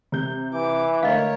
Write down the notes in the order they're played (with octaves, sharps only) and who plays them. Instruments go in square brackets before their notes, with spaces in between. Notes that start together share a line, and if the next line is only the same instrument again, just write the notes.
[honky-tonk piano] C3 G6
[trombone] E3 [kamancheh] D6
[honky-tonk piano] D3 A3 [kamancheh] A#4 C#5 [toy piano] D#5 F5